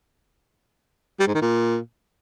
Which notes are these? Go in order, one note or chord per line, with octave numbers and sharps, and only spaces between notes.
G3
G#2
D#3
A#2